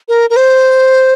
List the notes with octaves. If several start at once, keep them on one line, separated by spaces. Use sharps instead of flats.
A#4
A#4
C5